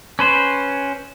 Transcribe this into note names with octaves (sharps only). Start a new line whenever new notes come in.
C#4 B4 C5